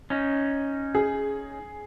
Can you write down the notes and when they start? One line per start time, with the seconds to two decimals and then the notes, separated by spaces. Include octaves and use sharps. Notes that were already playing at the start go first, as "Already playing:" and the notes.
0.10 C#4 D#4
0.95 G#4